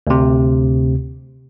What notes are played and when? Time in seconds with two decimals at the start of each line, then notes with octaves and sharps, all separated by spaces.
0.07 D2 C3